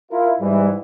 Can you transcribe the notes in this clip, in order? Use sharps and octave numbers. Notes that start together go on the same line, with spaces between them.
E4 F4 A#4
G#2 E3 G3